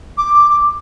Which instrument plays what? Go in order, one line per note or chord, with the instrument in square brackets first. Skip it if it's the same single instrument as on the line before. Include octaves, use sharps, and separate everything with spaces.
[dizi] D6